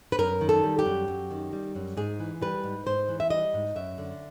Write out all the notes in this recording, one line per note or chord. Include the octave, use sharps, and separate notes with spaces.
B4
F#2 A#4
D#3
A4
G3
G4
F#2
F#2
D#3
G3
F#2
G#2 G#4
E3
G3 B4
G#2
G#2 C5
E3
E5
G3 D#5
G#2
F#2 E5
D3